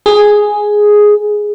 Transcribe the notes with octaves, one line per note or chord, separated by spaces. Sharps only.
G#4